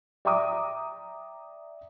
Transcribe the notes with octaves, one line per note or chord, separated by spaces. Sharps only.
D5 E5 G5 A#5 D6 D#6